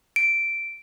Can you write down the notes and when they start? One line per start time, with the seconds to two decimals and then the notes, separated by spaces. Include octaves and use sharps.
0.16 D7